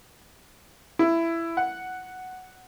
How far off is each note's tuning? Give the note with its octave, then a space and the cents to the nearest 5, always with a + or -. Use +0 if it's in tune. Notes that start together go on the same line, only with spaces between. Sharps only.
E4 +15
F#5 +0